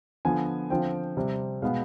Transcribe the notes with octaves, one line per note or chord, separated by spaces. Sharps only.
D3 F3 B3 G#5
D3 F3 C4 G5
C3 G3 C4
B2 G#3 B3 F5